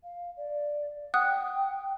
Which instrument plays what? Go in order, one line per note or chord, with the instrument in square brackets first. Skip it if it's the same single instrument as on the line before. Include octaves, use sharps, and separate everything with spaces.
[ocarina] F5
D5
[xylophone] F#5 D#6 F#6 [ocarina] G5